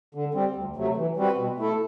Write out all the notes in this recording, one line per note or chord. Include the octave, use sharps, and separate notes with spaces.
D3
G3 C4
D2
C3 F#3 A3
E3
G3 C4 F#4 B4
B2
A3 E4 A4